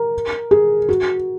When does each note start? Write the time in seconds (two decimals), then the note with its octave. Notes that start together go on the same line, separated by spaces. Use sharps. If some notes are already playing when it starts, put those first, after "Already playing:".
Already playing: A#4
0.51 G#4
0.89 F#4